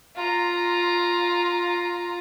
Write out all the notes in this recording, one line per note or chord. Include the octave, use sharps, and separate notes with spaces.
F4 A#5